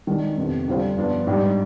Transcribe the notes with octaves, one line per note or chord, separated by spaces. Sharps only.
D#3 G#3 D4
F2 C3 D#3 B3
D3 G3 D4 F4 C5
G2 F3 B3 D4
G#2 G3 D4